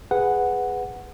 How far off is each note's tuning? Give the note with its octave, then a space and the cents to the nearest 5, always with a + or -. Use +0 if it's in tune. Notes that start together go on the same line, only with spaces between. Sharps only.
G#4 +0 B4 +10 F#5 +0